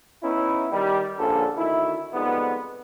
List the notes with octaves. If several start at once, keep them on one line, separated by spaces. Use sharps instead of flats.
B3 C#4 D#4 E4
D#3 G3
A#1 G2 D3 C#4 A4
D2 D#3 E4
F2 G#2 G3 B3